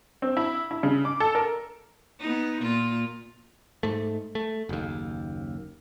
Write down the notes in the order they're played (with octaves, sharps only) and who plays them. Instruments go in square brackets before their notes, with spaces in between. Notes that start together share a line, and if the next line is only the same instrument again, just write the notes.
[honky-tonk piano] C4
E4
E4
C#3
D6
A4
A#4
[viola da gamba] B3 D#4
A#2 F4
[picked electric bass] G#2 A3
A3
F#1 D#2